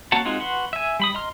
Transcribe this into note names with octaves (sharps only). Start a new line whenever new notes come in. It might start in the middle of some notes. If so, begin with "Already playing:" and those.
A#3 C#4 F#4 F#5 A5
G#3 C4 D#4 F4 F#4
F#4 B4 F#5 C6
E5 G#5
G3 B5 D#6
D#5 A#5 C6 F6